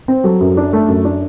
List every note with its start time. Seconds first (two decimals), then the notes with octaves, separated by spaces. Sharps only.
0.08 C4
0.24 F#3 A4
0.41 F#2
0.57 D4
0.73 A3
0.88 F#2
1.05 D4